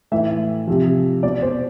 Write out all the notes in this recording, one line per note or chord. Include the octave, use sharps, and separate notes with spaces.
A2 E3 E5
C3 F3
B2 D5
C5